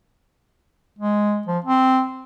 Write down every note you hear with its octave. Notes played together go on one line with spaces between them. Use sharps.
G#3
F3
C4